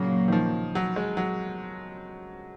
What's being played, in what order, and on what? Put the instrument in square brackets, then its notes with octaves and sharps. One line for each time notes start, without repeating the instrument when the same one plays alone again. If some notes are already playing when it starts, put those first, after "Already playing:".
Already playing: [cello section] A#2 F#3 A#3 [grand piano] C#3
[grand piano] D#3
F3
F#3
G#3
F#3